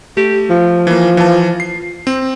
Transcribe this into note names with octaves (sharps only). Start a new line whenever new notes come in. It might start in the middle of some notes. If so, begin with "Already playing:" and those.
A3 G4
F3
E3 A#3
E3 A5
C7
C4